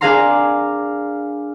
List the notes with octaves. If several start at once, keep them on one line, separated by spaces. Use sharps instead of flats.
D4 G#4 A#4 F5 A#5 C6